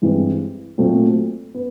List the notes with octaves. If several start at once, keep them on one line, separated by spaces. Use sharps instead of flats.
G2 E3 G#3 C4
A#2 F#3 A3 C4
B3